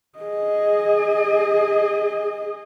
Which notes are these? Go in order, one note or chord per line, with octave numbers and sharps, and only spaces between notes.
G#4 D#5